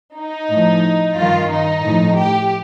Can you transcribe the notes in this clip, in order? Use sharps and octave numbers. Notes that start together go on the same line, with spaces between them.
D#4
A2 F3
G2 D#3 F4
D#4
A2 F3
G4